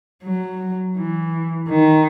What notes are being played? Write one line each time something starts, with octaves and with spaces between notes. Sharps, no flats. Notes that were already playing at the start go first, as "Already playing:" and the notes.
F#3
E3
D#3